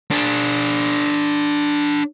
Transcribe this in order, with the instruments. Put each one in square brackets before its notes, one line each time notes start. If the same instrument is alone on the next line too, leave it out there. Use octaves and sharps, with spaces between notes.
[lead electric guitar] D4 G#4